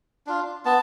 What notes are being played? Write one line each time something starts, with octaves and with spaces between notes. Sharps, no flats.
D4 F4
B3 A5